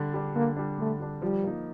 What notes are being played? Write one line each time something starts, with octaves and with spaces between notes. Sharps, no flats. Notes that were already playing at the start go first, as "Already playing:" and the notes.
Already playing: D3 G3 D4
G3 D4
D3 A#3
G3 D4
D3 A3
G3 D4
F3 G3
A#3 D#4